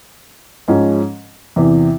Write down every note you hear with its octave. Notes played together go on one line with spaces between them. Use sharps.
G#2 F3 G#3 C#4
E2 C3 E3